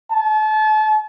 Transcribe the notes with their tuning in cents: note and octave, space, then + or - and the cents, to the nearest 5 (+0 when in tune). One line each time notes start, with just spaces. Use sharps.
A5 -35